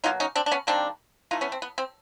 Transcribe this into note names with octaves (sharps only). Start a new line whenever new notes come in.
B2 F#3 A#3 D#4 F4
C#4 D#4
C4 D4
D4
B3 C#4
D#3 G3 A#3 C4 D4
E3 A3 D#4 F4
B3 C#4
C4
B3
C4